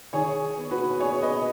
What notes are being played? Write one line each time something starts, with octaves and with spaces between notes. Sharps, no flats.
D#3 G#4 C#5
B3
F#4 B4
B3 G#4 C#5
B4 D#5